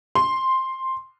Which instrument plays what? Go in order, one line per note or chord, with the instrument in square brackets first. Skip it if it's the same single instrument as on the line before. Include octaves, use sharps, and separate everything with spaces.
[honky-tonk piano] C6